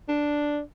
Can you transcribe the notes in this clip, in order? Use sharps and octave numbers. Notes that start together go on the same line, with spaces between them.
D4